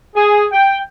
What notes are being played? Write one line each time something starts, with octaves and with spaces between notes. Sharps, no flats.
G#4
G5